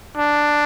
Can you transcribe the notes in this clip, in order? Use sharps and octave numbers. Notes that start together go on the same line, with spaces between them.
D4